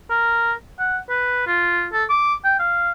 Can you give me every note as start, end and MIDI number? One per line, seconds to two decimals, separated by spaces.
0.10 0.53 70
0.79 0.98 78
1.09 1.43 71
1.47 1.86 65
1.93 2.04 69
2.10 2.34 86
2.45 2.54 79
2.59 2.91 77